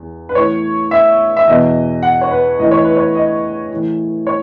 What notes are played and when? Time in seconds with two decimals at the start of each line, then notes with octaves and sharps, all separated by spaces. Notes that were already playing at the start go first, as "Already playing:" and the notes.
Already playing: E2
0.29 B4
0.35 A2 E3 C#5
0.91 E5
1.37 E5
1.47 E2 B2 D#5
2.03 F#5
2.21 C#5
2.31 B4
2.59 A2 E3 D#5
2.71 C#5
2.84 B4
2.97 C#5
3.15 D#5
3.71 A2 E3
4.27 C#5